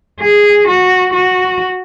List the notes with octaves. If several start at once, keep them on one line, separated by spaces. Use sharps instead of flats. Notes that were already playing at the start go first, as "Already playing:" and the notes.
G#4
F#4
F#4